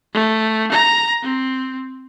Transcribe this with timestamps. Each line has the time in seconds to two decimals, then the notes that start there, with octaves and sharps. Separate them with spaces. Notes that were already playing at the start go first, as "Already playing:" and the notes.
0.13 A3
0.72 A#5
1.23 C4